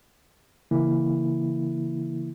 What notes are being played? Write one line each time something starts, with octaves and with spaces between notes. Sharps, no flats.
C#3 E3 A#3 E4